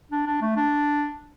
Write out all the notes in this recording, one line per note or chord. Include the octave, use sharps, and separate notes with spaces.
D4
D4
A3
D4